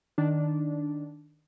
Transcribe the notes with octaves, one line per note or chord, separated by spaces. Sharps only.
D#3 D4